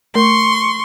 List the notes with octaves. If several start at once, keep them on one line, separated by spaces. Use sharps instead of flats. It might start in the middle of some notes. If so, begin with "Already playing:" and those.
A3 A#4 C6 C#6